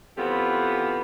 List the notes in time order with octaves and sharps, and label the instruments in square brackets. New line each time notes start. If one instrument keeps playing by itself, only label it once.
[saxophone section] E3 B3 C4 F4 G4 A4